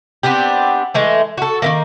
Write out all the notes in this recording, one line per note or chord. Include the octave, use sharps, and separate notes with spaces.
B3 C4 D4 G4
E3 G#3 A3
F#4 A4
D#3 E3 A#3